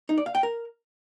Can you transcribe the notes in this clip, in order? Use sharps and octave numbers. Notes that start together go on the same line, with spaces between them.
D#4
D5
F5
G5
A#4